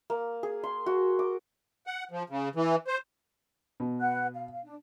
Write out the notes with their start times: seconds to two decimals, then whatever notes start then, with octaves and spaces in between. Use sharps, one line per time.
0.10 A#3
0.43 G#4
0.64 C6
0.86 F#4
1.19 D6
1.87 F#5
2.11 F3
2.30 C#3
2.56 E3
2.87 C5
3.80 B2
4.00 B4 F#5 F#6
4.35 F5
4.52 F5
4.64 D4